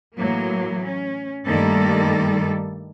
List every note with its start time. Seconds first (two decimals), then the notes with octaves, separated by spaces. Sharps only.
0.17 A2 E3 F#3 A#3
0.84 C#4
1.48 G2 D#3 G3 A3 A#3 A4